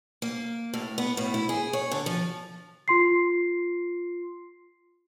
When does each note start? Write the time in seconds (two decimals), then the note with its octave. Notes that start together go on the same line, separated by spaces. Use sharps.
0.22 A#3
0.74 A2
0.98 B3
1.17 A2
1.34 E4
1.49 G#4
1.73 C#5
1.91 D3
2.06 F3
2.88 F4 C6 C7